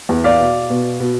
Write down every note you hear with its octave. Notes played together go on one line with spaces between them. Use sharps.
E2
D5 F5
B2
B2
B2